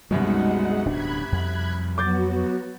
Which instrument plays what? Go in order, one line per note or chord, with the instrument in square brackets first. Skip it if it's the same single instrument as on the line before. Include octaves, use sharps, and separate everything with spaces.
[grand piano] C2 F#2 B2 [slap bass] G3 [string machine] G#3 D#4 F#5
[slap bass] D1 D4 [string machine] B5 F#6 G#6
[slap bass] F2
[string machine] F#3 B3 F#4 [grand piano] D6 G6 A6